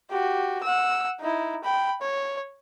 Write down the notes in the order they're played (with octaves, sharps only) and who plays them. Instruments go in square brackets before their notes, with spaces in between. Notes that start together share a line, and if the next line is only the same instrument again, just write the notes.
[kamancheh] F#4 G4
F#5 E6
D#4 E4
G5 B5
C#5